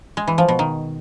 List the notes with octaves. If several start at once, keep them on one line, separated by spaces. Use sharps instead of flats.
G#3
E3
F3
B2
D#3